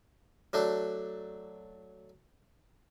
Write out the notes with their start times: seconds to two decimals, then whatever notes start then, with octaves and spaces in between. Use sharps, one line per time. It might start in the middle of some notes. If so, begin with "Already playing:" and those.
0.53 F#3 A3 D4